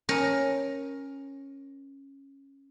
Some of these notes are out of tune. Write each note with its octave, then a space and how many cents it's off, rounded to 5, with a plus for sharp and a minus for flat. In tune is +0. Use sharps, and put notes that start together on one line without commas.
C#4 -10 A#4 +10